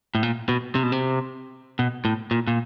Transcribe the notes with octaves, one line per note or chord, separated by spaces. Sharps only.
A2
A#2
B2
C3
B2
C3
B2
A2
A#2
A#2